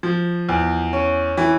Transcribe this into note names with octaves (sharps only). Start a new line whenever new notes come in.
F3
E2
C#4
E3